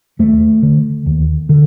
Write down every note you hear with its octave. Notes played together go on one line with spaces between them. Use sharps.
D#2 A3
D3
D#2
D3